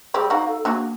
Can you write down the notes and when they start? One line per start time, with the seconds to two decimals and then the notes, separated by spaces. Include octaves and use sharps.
0.14 G3 C4 G#4
0.30 D#4 F#4 F5
0.48 A4
0.65 A#3 D4 F#4 G#4